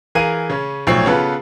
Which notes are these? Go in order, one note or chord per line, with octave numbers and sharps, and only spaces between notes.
E3 G#4 A#4 F5 D#7
C#3 C#4
B1 A2 F3 F#3 C#5 C7
C#3 B3 F4 A4 B4